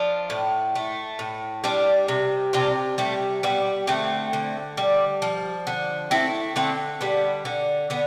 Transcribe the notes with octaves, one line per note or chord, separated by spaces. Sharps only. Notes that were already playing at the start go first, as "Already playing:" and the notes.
Already playing: F3 D4 F4
A2
A3
A2
G3 D4 F4
C3
C3 D4 F4
G3 A3
G3 B3
D3 A3 C4
D3
G3
F3
D3
A3 C4 E4
D3 A3 C4
G3 B3
D3
D3 B3